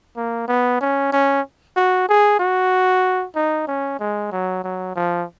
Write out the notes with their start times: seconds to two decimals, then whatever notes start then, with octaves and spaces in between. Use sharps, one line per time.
0.17 A#3
0.48 B3
0.81 C#4
1.12 C#4
1.76 F#4
2.09 G#4
2.39 F#4
3.35 D#4
3.67 C#4
3.99 G#3
4.32 F#3
4.64 F#3
4.96 F3